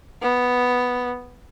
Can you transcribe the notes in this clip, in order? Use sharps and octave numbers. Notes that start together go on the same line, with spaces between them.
B3